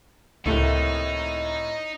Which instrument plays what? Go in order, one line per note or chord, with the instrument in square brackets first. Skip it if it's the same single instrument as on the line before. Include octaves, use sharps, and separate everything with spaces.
[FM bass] C#2 [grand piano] A2 [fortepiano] C3 A3 A#3 [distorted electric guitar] D#4